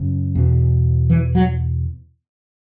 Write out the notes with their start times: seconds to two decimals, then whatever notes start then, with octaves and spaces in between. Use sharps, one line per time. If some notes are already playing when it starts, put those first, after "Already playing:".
Already playing: F#2 C#3
0.35 E2 B2
1.10 E3
1.35 F#3